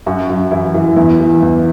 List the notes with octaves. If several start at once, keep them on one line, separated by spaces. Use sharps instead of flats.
F#2 F#4
F#2
E3 E4
E3
E2 E4
E3
E2